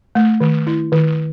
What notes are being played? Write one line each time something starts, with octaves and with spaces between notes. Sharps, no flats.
A3
D#3
E4
D#3